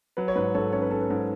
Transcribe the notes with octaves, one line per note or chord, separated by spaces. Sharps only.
F#3 B4
C#5
G#2 B4
G#2 A4 C#5
C#4 C#5
B4
C#4 A4
B4
G#2